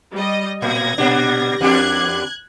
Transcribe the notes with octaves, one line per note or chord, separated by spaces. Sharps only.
G3 D#5
A2 G#6 A#6
A#2 G3 D4
E2 D4 G4 F#6 G#6